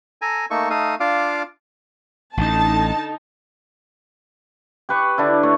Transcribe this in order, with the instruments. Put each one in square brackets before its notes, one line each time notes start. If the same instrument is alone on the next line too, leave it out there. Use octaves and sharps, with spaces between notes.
[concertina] A4 G#5 A#5
A3 A#3 D#4 A4 C#6
A3 D#4 A4 F5 D#6
D4 F4 F5 D6
[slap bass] A1 [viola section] D3 D#4 [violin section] A5
[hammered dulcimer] G4 B4 C#6
D3 D4 E4
A3 C#5